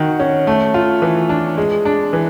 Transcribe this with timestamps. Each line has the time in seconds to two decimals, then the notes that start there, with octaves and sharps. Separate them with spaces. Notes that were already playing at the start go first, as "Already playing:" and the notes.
Already playing: D#3 F#4
0.20 C#4
0.47 A3
0.74 F4
1.02 E3
1.29 D4
1.58 G#3
1.85 D4
2.13 E3